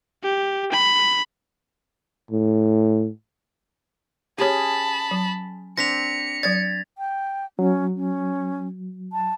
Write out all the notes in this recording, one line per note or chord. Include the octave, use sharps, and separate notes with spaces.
G4
B5
A2
C#4 G4 G#4 C#5 A5 B5
F#3
C4 D4 A#6 B6 C#7 F7
F#3 D5 G#6 A6
G5
F#3 C#4
C#4
A5